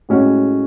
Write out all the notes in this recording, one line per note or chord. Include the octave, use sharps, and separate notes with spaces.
A2 G#3 C#4 F#4